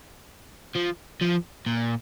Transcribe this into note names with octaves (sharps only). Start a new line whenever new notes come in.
F3
F3
A#2